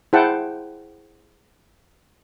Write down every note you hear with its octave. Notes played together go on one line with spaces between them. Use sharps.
E4 G#4 C5 F#5 G5 A5